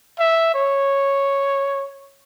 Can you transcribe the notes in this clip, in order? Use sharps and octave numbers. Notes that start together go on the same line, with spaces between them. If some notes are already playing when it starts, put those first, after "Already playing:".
E5
C#5